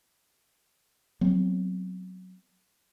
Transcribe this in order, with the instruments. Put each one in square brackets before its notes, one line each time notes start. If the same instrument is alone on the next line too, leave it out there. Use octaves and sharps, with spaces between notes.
[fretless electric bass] F#3 B3 C4